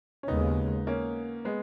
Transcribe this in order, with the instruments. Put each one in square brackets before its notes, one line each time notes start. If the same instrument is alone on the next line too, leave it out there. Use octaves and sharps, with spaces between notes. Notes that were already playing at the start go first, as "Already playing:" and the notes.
[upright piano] C#4
[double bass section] D#2 C#3 G#3 [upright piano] B3 D#4
[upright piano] A#3 C#4
G#3 B3